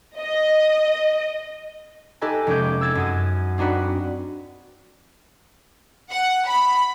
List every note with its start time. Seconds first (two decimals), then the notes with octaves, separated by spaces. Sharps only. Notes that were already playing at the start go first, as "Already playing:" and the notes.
0.19 D#5
2.21 D#4 G4 A4 B4 D#5 G#5
2.47 F1 G#3 C#4 D6 G6
2.81 E6 G#6 A6 E7
2.95 F#2 D#6
3.58 C4 D4 D#4 F#4 B4
6.11 F#5
6.48 B5